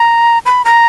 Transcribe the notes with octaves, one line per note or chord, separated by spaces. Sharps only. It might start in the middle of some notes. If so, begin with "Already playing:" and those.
Already playing: A#5
B5
A#5